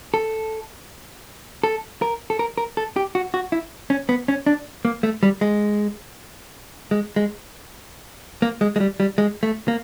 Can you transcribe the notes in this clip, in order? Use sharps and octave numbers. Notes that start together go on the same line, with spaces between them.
A4
A4
A#4
A4
A#4
A#4
A4
G4
F#4
F#4
E4
C#4
B3
C#4
D4
A#3
A3
G3
G#3
G#3
G#3
A#3
G#3
G#3
G3
G3
G#3
A3
A#3